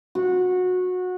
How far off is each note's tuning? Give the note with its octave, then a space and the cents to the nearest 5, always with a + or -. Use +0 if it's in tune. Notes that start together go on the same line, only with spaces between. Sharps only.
F#4 -20